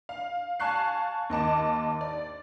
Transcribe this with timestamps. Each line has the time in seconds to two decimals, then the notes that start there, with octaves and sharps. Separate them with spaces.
0.09 F5
0.60 F5 G#5 A5 C#6 F#6 C7
1.30 D#2 D#5 A5 D6
2.01 D5